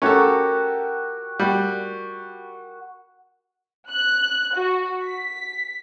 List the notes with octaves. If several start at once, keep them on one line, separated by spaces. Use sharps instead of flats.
C#4 F#4 G4 A4 A#4
G3 F#4
F#6
F#4
B6